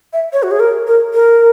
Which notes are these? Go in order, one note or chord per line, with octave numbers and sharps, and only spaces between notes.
E5
C#5
F#4
G#4
A#4
A#4
A#4